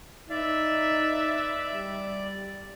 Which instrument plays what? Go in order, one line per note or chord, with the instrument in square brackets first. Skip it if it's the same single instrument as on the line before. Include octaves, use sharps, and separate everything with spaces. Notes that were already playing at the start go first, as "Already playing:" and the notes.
[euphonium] D#4 [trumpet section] B4 E5 [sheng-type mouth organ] D5
[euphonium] G3